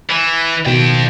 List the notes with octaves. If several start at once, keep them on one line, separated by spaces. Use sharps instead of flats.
E3
A1 B2 D#3 F3 G5